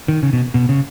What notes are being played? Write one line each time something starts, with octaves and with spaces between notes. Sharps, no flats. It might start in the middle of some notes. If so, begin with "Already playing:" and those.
D#3
C#3
B2
B2
C#3